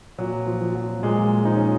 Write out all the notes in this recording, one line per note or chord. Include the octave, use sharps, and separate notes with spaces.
A#2 F#3
F3
F3
F#3
A#2 G#3
F3 D#4
C#4